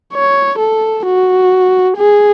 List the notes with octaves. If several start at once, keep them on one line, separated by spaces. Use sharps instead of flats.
C#5
A4
F#4
G#4